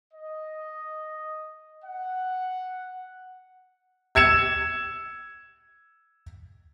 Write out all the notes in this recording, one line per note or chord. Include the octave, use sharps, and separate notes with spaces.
D#5
F#5
E6 G#6 C#7 E7